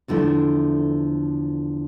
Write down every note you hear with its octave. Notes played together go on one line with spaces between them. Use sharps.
E2 D3 F3 A3 E4